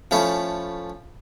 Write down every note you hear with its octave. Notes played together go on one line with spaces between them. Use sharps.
F3 A3 C#4 E4